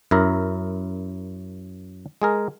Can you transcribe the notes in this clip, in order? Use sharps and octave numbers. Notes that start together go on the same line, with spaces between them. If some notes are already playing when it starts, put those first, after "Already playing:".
F#2 E4 A#4
G#3 G#4 A#4